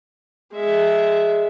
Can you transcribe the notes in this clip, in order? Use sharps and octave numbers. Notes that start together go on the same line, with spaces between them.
G#3 E5